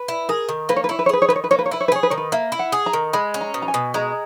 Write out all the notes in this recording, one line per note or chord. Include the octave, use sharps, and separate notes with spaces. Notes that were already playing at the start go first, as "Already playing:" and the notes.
Already playing: B4
E4
G#4 A#4
D#3
A#3 B4
C#5
B4
E4 C#5
B4
C#5
G#4 B4
C#5
D#3 B4
C#5
B4
A#3 C#5
B4
C#5
E4 B4
C#5
B4
G#4 C#5
B4
D#3 C#5
B4
A#3 E5
E4
F#5
G#4
A#5
D#3
G#3 B5
C#4
A#5
B2
A#5
G#5
B2
G#3 A#5